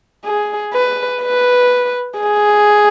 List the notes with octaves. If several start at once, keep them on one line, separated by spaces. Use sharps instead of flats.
G#4
B4
B4
G#4